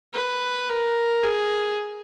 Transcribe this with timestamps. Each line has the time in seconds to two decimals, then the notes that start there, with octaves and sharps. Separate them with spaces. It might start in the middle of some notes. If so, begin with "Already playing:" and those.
0.14 B4
0.69 A#4
1.24 G#4